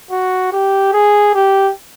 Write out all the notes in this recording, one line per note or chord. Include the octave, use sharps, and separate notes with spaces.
F#4
G4
G#4
G4